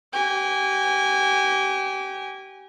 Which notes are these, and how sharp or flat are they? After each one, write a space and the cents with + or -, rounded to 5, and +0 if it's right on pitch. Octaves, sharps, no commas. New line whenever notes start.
G4 -30 G#5 -25